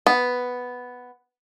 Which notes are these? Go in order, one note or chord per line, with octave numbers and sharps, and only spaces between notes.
B3